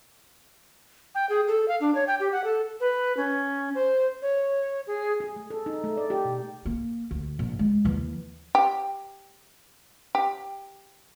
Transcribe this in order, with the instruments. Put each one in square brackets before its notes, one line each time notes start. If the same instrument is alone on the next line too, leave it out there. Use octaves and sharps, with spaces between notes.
[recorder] G5
G#4
A4
F5
D4
C#5
G5
G4
F#5
A4
B4
C#4
C5
C#5
G#4
[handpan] G#4
A3
A4
D#4
A3
D5
G4
B2
[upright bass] A#3
D2
A#1
G#3
D#2 E3
[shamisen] G4
G4